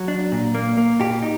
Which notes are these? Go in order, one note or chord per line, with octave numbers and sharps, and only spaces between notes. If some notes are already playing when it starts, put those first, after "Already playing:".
Already playing: F#3
D4
A#2
A#3
A#3
A#2 G4
D#4